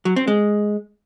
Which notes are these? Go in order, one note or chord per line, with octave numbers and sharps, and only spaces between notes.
F#3
C4
G#3